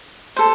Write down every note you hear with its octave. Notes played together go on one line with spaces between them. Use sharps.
A4 C5